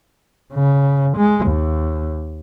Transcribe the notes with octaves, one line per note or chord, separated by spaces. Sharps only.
C#3
G#3
D#2